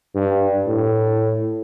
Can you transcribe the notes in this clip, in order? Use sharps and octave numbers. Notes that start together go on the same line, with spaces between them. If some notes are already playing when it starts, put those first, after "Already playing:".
G2
A2